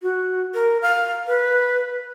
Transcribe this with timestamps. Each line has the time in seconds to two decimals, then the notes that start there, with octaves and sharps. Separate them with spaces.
0.02 F#4
0.54 A#4
0.82 F5
1.27 B4